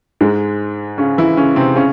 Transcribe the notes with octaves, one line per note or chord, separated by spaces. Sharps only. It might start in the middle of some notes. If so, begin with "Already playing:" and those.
G#2 G#3
C#3 C#4
E3 E4
C#3 C#4
C3 C4
C#3 C#4